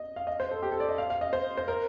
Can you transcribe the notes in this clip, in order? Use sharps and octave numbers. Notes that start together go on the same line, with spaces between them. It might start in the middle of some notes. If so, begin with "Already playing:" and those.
Already playing: D#5
F5
D#5
C5
A4
G4
A4
D5
D#5
F5
F5
D#5
C5
C5
A#4